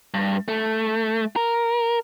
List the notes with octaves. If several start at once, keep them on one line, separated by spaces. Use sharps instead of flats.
G2
A3
A#4